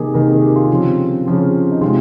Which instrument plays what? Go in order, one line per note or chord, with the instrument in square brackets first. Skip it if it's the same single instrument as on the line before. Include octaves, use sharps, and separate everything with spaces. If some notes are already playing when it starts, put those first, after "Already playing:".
Already playing: [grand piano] C3 D#3 A#3 G4 G#4
C3 D#3 A#3 A#4
G#4
G4
F4
C#3 F3 C4
C#3 F3 C4
D#4
C3 D#3 G#3 C4 F4